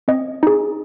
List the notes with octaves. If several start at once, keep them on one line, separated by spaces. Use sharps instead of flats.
C4 D#5
D#4 G#4